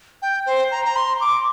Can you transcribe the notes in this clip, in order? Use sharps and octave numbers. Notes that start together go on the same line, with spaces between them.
G5
C5
A#5
A#5
C6
D6